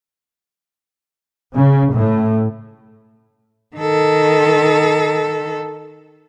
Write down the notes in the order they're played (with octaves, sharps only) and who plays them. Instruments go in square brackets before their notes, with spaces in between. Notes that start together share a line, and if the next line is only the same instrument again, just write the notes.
[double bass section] C#3
A2
[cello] D#3 A4